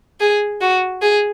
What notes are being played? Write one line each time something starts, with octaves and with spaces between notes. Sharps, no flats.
G#4
F#4
G#4